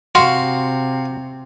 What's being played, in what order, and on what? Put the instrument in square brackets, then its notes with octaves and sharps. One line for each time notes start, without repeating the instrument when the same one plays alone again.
[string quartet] C3 [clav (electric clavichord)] F#4 [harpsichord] F5 [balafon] C6